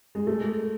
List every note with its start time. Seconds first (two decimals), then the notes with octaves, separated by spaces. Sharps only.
0.15 G#3
0.27 A3